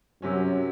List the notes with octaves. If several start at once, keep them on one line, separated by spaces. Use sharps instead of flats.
F#2 C3 F#3 C#4